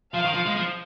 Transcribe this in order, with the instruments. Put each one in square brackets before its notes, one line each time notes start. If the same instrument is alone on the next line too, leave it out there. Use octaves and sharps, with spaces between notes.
[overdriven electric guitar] F3 [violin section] F5
[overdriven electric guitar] D#3
F3
G#3
F3